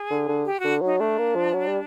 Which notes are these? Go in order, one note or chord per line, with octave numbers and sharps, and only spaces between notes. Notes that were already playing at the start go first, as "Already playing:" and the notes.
Already playing: G#4
D3
D3
G4
D3 F#4
F#3 D#4
A3 D4
A#3
F3
F#3
G3